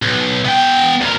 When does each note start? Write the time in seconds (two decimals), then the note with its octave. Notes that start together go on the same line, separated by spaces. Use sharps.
0.02 B1
0.45 B3 G5
1.01 D2 A#4